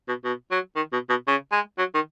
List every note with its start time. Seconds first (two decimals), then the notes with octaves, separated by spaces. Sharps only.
0.08 B2
0.25 B2
0.51 F#3
0.76 D#3
0.93 B2
1.10 B2
1.28 C#3
1.52 G#3
1.78 F#3
1.94 D#3